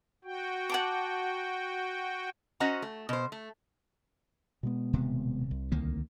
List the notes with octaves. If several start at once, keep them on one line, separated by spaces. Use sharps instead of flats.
F#4 G5
F#5 A5 D6
C#4 F#4 C5 D#5 F#5 A#5
A3
B2 C5
A3
B2 G#3 B3
D#1 C3
C2
D2 D#3 A#3